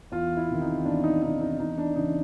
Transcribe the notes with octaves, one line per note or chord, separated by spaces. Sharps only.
E2 F4
E4
C3 D#3
D#4
E2 D4
D#4
C3 D#3 D#4
D#4
E2 D#4
D4
C#3 E3 D#4